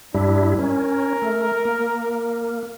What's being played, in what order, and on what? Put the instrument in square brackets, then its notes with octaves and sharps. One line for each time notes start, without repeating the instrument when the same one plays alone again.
[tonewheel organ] G2 G3 E4 [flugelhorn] D4
[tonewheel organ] C#4 [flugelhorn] A#4
[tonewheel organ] A3
A#3